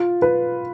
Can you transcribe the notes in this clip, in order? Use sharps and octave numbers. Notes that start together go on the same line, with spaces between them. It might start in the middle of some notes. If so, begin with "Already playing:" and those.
Already playing: F4
B4